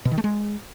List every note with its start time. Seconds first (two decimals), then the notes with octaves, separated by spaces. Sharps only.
0.05 B2
0.11 D#3
0.18 A3
0.24 G#3